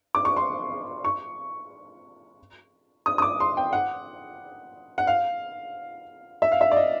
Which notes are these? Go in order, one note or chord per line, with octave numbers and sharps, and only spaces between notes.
D6
C#6
C6
C#6
D#6
D#6
D6
C6
G5
F#5
F#5
F5
E5
F5
E5
D5
D#5